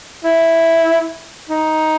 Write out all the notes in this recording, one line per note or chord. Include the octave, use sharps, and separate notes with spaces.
E4
D#4